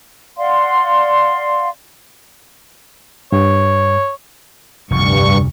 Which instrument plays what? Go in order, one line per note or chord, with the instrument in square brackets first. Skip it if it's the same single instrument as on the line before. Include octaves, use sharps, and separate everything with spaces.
[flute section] D5 F5 F#5 C6
[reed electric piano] G2 [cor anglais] C#5
[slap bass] F1 D2 [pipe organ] G2 C#6